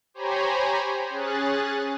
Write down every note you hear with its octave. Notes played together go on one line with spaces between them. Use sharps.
G4 C5 C#5 G#5 A#5 B5
C#4 G#4 F#6 A6